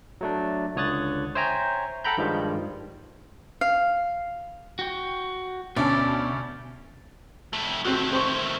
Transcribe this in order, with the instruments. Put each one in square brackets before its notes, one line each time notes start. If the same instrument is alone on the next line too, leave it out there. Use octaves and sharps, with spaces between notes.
[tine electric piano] F#3 A3 D4
C#2 D3 C#5 D#6 F#6 A6
C5 C#5 E5 G5 G#5 A#5
A4 F#5 G5 A#5 B5 G6
G2 D#3 F3 G3 G#3
[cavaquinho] F5
[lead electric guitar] F#4 G5
[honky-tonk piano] D2 C#4 A5 [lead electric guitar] B2 [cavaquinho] D5
[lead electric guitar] F2 A3
[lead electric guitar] D#3 A3 [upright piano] C4 F#4
[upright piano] C4 C5 C#6